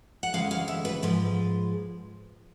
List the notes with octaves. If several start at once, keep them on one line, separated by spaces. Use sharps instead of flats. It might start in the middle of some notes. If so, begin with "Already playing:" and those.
F#5
D2 C#3 E3 G#3 F5
F5
E5
B4
G#2 F3 G#3 B4